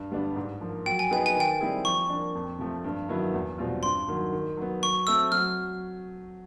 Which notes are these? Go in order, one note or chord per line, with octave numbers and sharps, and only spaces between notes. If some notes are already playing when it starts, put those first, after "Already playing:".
Already playing: G2
D3 G3 B3 D4
G#2
F3 A#3
F#3 G5
G#5
B3 D#4 G#4 B4 G5
G#5
D#3 G5
G3 C4 E4 G#4
F3 C#6
A#3 D4
F2
C3 F3 A3
G2
D#3 F#3 B3 E4
E2
B2 G3 C4 F4
G2 C6
D#3 F#3
D#3
F#3 B3
F#3 C#6
A3 C4 E6
F#3 F6